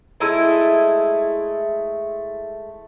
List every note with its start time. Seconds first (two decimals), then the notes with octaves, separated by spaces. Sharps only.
0.20 G#3 A3 E4 G#5